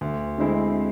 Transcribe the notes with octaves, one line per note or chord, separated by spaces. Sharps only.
D2
D3 G#3 C4 E4